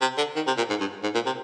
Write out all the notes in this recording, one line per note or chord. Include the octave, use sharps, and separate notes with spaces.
C3
D3
D#3
C3
A#2
G#2
G2
G#2
A#2
C3